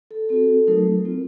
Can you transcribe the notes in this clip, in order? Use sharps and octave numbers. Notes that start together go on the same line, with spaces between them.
A4
C4 F#4 A4
F#3 A3 D#4 A#4
C4 F4